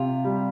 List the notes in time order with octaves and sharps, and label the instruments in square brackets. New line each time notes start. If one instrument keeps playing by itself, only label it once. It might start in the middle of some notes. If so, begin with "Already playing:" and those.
Already playing: [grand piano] C3 [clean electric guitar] F4
[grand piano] G3